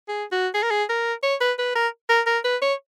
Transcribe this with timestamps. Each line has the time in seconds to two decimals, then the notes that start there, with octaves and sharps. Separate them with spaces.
0.08 G#4
0.32 F#4
0.54 G#4
0.63 A#4
0.71 G#4
0.89 A#4
1.23 C#5
1.40 B4
1.59 B4
1.75 A#4
2.09 A#4
2.26 A#4
2.44 B4
2.62 C#5